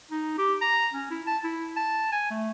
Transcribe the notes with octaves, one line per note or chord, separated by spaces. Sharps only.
D#4
G4
A#5
C#4
E4
A5
E4
A5
G#5
A3